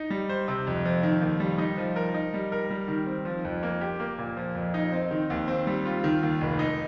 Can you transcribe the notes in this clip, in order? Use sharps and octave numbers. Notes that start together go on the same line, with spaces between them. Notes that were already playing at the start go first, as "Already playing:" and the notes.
Already playing: D#4
G3
C5
C3
F2
F3
D#3
D#2
G3
D#4
F3
A#4
D#4
G3
A#4
G3
D#3
C4
F3
F2
A#3
G4
A#3
A#2
F3
F2
D#4
C4
D#3
D#2
C4
G3
F4
D#3
D#2
F1
D#4